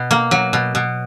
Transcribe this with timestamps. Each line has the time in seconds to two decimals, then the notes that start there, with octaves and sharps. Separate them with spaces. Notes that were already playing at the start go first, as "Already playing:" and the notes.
Already playing: B2
0.11 A#3
0.31 F#3
0.53 B2
0.75 B2